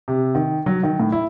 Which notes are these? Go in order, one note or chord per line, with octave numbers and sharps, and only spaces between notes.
C3
D#3
F#3
D#3
A2
E4